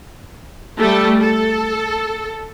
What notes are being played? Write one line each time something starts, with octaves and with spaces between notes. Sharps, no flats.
G3 A3 A4
A4